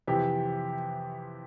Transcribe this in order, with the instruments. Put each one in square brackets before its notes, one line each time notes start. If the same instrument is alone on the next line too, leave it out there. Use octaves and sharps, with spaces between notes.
[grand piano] F2 C3 E3 G4